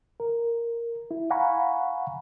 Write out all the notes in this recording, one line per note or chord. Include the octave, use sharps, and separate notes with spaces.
A#4
E4
F5 F#5 G#5 A#5 B5 C#6